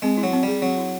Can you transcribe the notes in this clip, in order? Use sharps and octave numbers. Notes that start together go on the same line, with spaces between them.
G#3 C4
E4
F#3
C4
G3 G#4
F#3 C4
E4